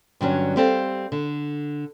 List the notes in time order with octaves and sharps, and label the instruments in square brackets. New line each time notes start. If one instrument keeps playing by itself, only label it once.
[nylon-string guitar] G2 D3 F#3 C#4
G3 C4 A4 F5
D3